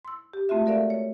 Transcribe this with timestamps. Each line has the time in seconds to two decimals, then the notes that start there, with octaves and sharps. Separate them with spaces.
0.05 C6 E6
0.33 G4
0.49 G#3 A3 C4 F4 F#4 E5
0.66 F#4 A4 A#4 D5 E5 F5
0.90 C#5